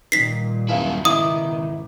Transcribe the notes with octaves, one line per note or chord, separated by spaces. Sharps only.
G2 A#2 D#3 G3 B6 C7
D#1 F#2 E4 F5
C#2 G#2 B2 D#3 E4 D6 D#6